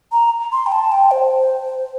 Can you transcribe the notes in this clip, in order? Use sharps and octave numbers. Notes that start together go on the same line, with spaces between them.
A#5
C6
G5
A5
G5
C5